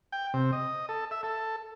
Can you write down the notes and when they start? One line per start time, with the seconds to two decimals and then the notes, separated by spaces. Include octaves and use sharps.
0.12 G5
0.34 C3
0.52 D#5
0.89 A4
1.11 E5
1.23 A4